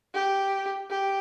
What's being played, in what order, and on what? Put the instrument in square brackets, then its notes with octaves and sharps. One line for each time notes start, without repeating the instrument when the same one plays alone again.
[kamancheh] G4
G4